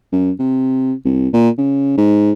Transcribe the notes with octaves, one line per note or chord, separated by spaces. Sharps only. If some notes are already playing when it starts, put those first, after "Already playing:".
F#2
C3
C2
A#2
C#3
G#2